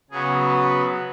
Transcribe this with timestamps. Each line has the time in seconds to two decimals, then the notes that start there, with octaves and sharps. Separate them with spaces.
0.11 C#3 F#3 B3 G#4
0.48 B4